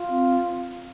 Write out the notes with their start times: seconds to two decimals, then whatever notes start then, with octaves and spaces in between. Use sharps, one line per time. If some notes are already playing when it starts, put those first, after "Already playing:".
Already playing: F4
0.08 C4